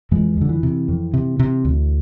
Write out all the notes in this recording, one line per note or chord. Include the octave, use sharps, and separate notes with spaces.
F2 E3 G#3
F2 D3
E3
C3
F2
C3
C3
D2